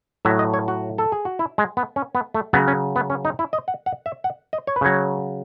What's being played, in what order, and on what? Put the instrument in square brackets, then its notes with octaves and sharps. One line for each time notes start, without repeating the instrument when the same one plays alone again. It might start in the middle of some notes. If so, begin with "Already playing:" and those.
[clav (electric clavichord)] A2 F#3 E5
D#5
C#5
F#4
A4
G#4
F#4
E4
G#3
B3
C#4
B3
A3
C#3 F#3 B3
C#4
B3
C#4
D#4
E4
D#5
F#5
F#5
E5
F#5
D#5
C#5
B4
C#3 F#3 C#5